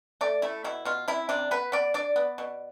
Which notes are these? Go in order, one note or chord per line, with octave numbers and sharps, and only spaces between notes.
A3 D5
A3 E4
B2 E4
B2 F4
C3 E4
C3 D4
B3 B4
B3 D5
D4 D5
B3
B2